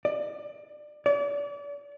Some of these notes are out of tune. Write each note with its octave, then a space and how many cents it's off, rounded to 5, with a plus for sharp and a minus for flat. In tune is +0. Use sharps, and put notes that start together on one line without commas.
D5 +25
D5 -40